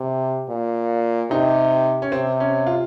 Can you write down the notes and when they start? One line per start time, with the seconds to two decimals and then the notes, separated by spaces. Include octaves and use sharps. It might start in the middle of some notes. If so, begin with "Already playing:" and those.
Already playing: C3
0.49 A#2
1.31 C3 D#4
2.02 C#4
2.12 C3 C4
2.40 C#4
2.67 F4